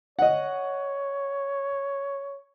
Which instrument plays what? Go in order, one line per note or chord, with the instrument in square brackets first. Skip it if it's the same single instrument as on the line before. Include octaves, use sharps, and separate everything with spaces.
[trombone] C#5 [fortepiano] D#5 F#5